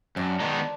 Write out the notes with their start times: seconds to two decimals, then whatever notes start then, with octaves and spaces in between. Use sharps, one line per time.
0.16 F#2 C4 D4
0.40 D#3 G#3 B3 D#4